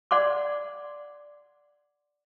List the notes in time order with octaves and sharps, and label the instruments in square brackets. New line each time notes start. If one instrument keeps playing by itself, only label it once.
[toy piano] D5 F#5 C6 D6